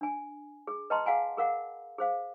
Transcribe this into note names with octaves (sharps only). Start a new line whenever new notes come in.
D4 G#5
G#4
B4 D#5 G5 A5 A#5 C6
G#4 F5 F#5 G#5 A#5
G#4 A#4 F5 F#5
G#4 C5 F5